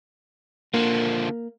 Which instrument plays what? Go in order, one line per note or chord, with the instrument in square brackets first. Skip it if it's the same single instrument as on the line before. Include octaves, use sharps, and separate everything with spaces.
[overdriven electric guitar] D3 F3 [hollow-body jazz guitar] A#3